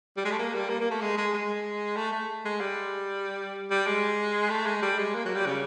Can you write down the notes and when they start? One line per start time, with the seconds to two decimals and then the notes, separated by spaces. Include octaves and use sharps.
0.17 G3
0.25 G#3
0.31 A3
0.38 A#3
0.54 G3
0.70 A#3
0.81 A#3
0.91 A3
1.01 G#3
1.18 G#3
1.33 G#3
1.96 A3
2.12 A3
2.45 G#3
2.61 G3
3.71 G3
3.87 G#3
4.50 A3
4.66 G#3
4.82 G3
4.98 G#3
5.15 A#3
5.25 F#3
5.35 G3
5.46 C#3